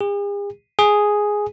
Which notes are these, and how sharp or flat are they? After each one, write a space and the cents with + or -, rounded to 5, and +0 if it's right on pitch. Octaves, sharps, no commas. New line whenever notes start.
G#4 -45
G#4 +0